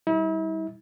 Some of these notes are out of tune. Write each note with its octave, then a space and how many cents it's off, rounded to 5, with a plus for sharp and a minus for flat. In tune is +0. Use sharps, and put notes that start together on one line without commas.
G3 -5 E4 -40